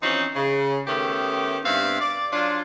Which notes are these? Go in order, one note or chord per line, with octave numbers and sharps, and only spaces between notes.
E3 F3 C4 C#4 D#4
C#3
D#3 A3 B3 C#4 G4
G2 B3 C4 E5 F5
D5
F#3 D4 F4